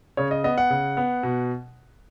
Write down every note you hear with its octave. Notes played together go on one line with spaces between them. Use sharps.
C#3 C#5
D#5
B3 D#5
F#5
C#3
B3
B2